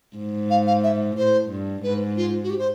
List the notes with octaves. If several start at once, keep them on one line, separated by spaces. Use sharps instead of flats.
G#2
F5
F5
E5
A2 C5
G2
G#2 B4
F4
F#4
G4
C5